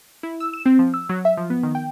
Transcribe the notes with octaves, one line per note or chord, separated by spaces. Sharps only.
E4
E6
E7
C4
F3
E6
F#3
E5
F3
B3
D#3
G5